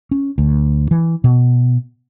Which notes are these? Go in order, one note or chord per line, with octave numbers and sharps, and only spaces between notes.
C#4
D2
E3
B2